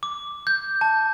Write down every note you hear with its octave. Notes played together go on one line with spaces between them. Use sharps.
D6
G6
A5